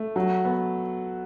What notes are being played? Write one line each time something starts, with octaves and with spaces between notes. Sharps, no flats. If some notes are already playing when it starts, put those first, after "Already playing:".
Already playing: A3
F#3
B3